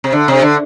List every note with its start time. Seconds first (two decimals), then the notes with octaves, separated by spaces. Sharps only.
0.04 C3
0.13 D3
0.28 C3
0.42 D3